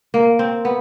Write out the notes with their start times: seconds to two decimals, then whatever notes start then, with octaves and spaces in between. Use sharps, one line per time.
0.14 A#3
0.39 C4
0.65 B3